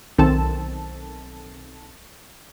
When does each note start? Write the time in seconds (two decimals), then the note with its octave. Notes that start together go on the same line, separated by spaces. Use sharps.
0.18 B1 D#3 C4 A4 A5